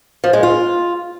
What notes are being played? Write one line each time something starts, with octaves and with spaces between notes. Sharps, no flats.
F3
G#3
F4